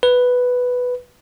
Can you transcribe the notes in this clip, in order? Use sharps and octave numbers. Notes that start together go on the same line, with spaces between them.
B4